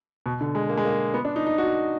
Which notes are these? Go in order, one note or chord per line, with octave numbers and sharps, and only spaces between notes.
B2
D3
G#3
A#3
G#3
A#3
B3
D4
D#4
D#4
F#4